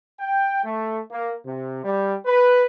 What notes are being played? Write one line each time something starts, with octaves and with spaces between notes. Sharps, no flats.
G5
A3
A#3
C3
G3
B4